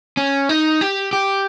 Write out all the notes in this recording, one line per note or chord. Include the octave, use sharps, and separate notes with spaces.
C#4
D#4
G4
G4